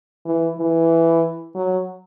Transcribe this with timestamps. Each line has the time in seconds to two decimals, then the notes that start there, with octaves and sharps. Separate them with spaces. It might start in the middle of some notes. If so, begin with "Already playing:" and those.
0.25 E3
0.58 E3
1.55 F#3